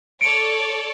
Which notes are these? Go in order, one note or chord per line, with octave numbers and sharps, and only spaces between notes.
A4 C#5 D5 C#7 D7